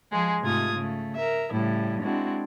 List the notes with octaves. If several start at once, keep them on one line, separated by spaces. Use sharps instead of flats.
F3 G#3 G#4
G#2 C3 A3 F4 D#6 G#6
C#3 A3
A#4 E5
A2 C#3 G3 E4
G#3 C4 D4 E4 F#4